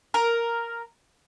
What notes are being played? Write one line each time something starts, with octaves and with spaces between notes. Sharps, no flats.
A#4